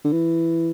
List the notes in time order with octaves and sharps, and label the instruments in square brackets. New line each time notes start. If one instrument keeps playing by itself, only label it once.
[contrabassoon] D3
E3